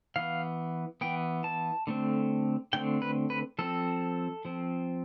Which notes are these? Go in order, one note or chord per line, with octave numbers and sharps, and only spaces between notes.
E3 B3 F5
E3 B3 G5
A5
D3 A3 C4
D3 A3 C4 G5
B4
B4
F3 C4 A4
F3 C4